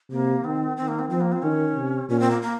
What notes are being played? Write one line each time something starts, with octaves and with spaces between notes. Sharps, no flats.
C3 A#3
D#3 C4
D#3 C4
A#3
C4
F3 C4
A#3
C4
D#3 C#4
C3
A#2 C#4
C4
A#3
A#3